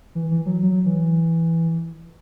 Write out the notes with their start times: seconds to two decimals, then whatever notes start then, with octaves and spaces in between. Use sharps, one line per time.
0.15 E3
0.31 E3
0.46 F#3
0.62 F#3
0.85 E3